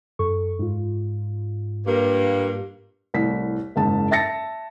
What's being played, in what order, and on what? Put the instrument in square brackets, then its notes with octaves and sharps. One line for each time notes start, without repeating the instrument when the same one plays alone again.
[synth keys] F#2 A4 C#6
G#2 F4
[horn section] G2 A#3
[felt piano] C2 A2 B6
F#1 G#2 A5
E5 A5 A6 A#6 C#7